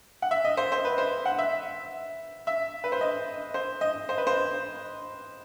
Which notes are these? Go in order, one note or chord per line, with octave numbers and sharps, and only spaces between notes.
F#5
E5
D#5
C5
C5
B4
C5
F#5
E5
E5
B4
C5
D#5
C5
D#5
C5
B4
C5